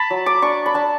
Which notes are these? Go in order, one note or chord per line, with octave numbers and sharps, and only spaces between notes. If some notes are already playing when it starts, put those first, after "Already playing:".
Already playing: A5 B5
F#3
D6
D4 C#6
B5
D4 A5